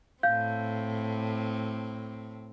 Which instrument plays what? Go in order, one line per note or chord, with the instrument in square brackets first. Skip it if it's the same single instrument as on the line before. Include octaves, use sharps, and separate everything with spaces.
[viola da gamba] A2 C4 [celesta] F5 G6